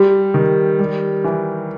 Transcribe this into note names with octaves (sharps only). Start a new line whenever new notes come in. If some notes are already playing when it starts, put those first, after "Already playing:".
Already playing: G3 G4
D#3
G3
E3